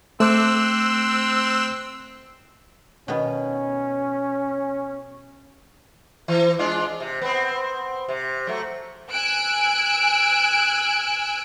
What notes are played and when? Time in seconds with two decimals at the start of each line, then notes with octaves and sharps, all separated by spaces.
0.20 A3 C4 C5 D6 E6 F#6
3.08 B2 D#3 B3 C#4
6.28 E3
6.59 G#3 D4 F4
7.00 C3
7.21 B3 C4
8.09 C3
8.47 F#3 A3
9.11 G#5 E6 F#6 D7